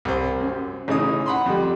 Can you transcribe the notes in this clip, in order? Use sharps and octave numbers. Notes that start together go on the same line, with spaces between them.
C2 C5
F#2
A1 C#3 E3 D#4 D#6
F#5 B5 C6
F2 G3